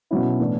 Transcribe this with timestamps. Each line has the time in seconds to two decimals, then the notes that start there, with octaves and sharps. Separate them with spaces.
0.11 B2 F#3 C#4 E4
0.40 A2 E3 B3 D4